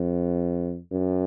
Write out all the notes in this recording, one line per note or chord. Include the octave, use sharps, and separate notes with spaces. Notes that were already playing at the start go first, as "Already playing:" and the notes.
Already playing: F2
F#2